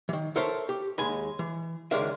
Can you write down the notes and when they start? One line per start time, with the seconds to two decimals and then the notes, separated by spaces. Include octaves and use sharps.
0.09 D#3 E3
0.36 A4 A#4 C5 C#5 E5 A5
0.69 G4
0.98 D#2 G#3 G#5 B5
1.39 E3
1.91 C#2 D#3 G#3 D4 A#4 E5